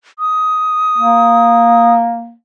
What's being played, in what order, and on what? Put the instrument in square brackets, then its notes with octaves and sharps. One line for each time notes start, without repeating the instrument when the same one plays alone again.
[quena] D#6
[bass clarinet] A#3